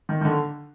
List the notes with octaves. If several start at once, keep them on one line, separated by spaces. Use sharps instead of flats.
D#3
D#3
D3